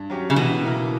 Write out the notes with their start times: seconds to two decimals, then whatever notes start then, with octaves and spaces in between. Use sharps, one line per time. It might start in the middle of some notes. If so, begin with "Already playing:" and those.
Already playing: G2
0.10 F#3 C#4 G4
0.30 C#3
0.36 B2 E3
0.63 A#3 E4 A#4